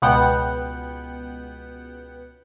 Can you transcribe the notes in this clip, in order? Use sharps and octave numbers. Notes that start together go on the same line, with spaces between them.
C#2 B2 B3 F#5 G5